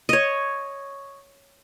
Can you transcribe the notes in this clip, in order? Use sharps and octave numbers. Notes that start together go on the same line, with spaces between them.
C#5 D#5